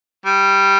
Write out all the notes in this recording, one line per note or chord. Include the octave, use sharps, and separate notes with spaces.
G3